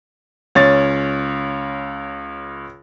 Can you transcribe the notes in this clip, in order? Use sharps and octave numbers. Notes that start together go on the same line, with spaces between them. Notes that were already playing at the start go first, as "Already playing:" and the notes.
C#2 C#4 C#5 A6